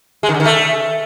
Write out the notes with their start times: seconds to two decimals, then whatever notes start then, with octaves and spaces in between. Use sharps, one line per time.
0.23 G#3
0.29 D#3
0.34 D3
0.40 D#3
0.45 A3